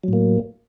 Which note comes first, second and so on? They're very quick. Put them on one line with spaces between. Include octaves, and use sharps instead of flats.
F#3 A2 A#3